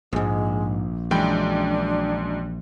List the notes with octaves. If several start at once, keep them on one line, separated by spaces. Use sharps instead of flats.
A#1 E2 G#2 G#3
F#2 E3 G#3 D4 G5 B5